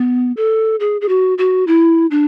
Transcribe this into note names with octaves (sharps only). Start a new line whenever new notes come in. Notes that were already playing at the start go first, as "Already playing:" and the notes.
Already playing: B3
A4
G#4
G#4
F#4
F#4
E4
D4